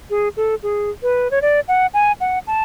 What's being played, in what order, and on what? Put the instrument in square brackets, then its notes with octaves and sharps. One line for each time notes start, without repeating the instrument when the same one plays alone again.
[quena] G#4
A4
G#4
B4
C#5
D5
F#5
G#5
F#5
A5